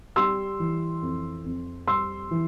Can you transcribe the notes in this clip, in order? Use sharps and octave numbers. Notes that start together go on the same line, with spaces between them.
G3 C6 E6
E3
F2
F2
G3 C6 E6
E3